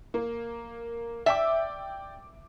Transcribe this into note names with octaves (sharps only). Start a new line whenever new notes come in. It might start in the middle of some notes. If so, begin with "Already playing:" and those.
A#3
D5 E5 G5 D6